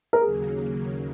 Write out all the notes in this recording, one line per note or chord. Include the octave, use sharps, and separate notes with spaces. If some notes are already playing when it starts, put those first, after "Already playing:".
A#4
D#2 C#3 F#3 A#3 G#4